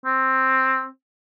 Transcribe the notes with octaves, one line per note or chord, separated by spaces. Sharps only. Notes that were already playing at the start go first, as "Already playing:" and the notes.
C4